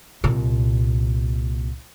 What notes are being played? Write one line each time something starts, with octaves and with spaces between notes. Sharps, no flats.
C2 A#2